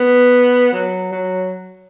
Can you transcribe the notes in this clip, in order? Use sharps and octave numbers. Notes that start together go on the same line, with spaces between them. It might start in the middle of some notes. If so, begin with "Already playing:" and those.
Already playing: B3
F#3
F#3